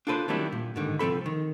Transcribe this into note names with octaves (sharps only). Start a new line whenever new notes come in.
D4 F4 A4 B4 C5
D#3 F#3 G3 C4 D4 E4
A#2
G#2 D3 D#3 G3
C2 F3 C4 A4 B5
D#3